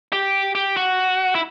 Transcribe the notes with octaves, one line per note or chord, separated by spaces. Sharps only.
G4
G4
F#4
E4